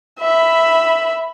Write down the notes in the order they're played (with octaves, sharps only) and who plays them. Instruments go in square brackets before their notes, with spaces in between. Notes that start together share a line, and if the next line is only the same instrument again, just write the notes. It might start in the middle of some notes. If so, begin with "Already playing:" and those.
[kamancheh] E5 B5